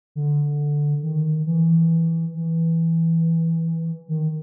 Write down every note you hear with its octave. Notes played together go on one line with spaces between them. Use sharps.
D3
D#3
E3
E3
D#3